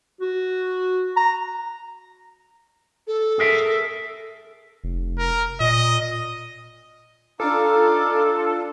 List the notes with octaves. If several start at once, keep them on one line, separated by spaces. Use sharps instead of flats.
F#4
A#5
A4
G#4 A#4 E5
F1
A#4
A#2 D#5
D4 D#4 F4 A4 F5 D6